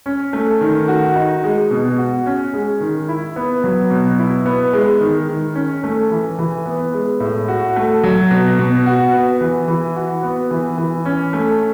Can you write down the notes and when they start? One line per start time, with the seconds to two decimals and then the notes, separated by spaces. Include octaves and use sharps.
0.06 C#4
0.33 A3
0.61 D#3
0.88 F#4
1.16 D#4
1.44 G#3
1.71 B2
1.98 F#4
2.26 C#4
2.54 G#3
2.80 D#3
3.08 E4
3.36 B3
3.64 F#3
3.90 B2
4.19 E4
4.46 B3
4.73 G#3
5.00 D#3
5.28 D#3
5.55 C#4
5.84 A3
6.10 E3
6.38 E3
6.66 B3
6.93 G#3
7.20 A2
7.48 F#4
7.76 A3
8.03 F#3
8.31 B2
8.59 B2
8.86 F#4
9.13 B3
9.41 E3
9.68 E3
9.96 F#4
10.23 B3
10.51 E3
10.78 E3
11.05 C#4
11.33 A3